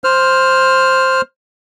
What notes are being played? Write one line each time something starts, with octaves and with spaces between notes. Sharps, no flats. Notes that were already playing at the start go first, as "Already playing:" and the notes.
C5 F6